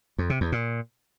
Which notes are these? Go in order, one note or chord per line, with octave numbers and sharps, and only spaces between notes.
F2
C3
E2
A#2